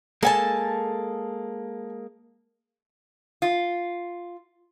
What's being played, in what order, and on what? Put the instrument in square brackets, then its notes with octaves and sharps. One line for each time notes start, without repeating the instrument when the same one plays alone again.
[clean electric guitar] G#3 A#3 [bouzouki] A4 G#5 A5
[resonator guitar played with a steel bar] F4